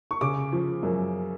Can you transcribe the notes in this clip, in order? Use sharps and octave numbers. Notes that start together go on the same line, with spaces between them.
C#6
C#3 D6
F3
F#2